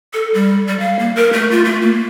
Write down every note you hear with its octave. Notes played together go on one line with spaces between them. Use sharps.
A4
G3
G3
F5
A#3
A#4
A3
F4
A3
A#3